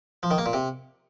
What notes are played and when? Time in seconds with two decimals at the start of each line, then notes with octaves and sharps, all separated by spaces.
0.23 F3
0.31 D#3
0.38 A#3
0.46 A#2
0.53 C3